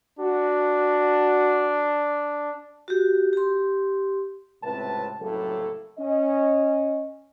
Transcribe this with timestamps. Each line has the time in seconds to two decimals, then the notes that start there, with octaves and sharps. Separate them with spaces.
0.19 D4 F#4
2.88 F#4 G4
3.33 G4 C6
4.62 C#2 A2 C3 C4 B4 A5
5.20 F#1 C2 A2 A#3 A4
5.98 C#4 D#5